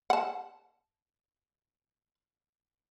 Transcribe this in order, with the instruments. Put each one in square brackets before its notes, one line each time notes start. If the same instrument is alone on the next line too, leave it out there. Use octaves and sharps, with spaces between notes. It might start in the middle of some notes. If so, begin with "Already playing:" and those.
[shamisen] F#5 A5